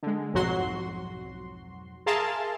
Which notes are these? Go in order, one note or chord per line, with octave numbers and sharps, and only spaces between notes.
D3 G#3
B1 F2 G#2 F#3 F#4 C6
G#4 A#4 E5 F5 A5 C6